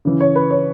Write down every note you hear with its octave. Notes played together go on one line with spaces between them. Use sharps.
C#3 E3
C#5
B4
C#5